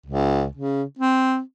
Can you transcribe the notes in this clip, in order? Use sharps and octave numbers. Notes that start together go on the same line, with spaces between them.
C#2
C#3
C4